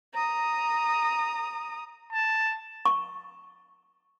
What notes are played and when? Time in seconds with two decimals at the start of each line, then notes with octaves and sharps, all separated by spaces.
0.14 A#5 D#6
2.12 A5
2.85 C#6